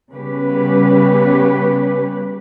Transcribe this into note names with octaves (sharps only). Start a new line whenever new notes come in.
C#3 G3 B3 C#4 G4 B4